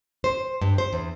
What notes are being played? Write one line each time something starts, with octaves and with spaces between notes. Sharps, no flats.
C5
G2
C5
E2